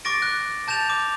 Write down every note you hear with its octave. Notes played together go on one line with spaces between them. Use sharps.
C#6 D6 A6 A#6 D7
F#6
A5 G6 A6 E7 F7
D6